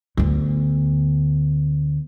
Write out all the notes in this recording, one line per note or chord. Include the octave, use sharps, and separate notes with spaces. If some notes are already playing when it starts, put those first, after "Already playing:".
D2 B3